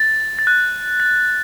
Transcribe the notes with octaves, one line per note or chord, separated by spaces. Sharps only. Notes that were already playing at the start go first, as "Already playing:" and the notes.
Already playing: A6
A6
F#6
A6